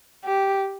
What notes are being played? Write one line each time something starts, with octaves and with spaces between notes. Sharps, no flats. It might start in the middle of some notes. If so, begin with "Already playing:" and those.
G4